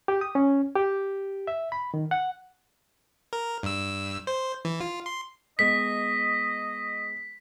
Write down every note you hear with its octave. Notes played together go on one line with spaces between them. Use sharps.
G4
D#6
C#4
G4
E5
B5
D#3
F#5
A#4
G2 E6
C5
E3
F4
C6
G#3 B3 D#5 B6